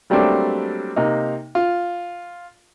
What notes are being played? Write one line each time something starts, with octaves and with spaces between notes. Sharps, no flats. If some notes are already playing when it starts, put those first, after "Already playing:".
F#3 G3 A3 A#3 C4 D4
C3 A#3 D#4
F4